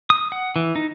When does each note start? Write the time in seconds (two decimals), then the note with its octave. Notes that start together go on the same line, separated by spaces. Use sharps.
0.10 D#6
0.32 F#5
0.56 E3
0.76 D#4